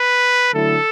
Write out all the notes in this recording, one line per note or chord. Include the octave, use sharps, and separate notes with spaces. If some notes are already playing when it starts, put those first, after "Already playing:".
Already playing: B4
D3 F#3 A3 E4 A4